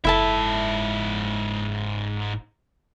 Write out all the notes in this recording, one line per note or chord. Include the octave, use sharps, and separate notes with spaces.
F#1 G#2 E4 A4 E5 A5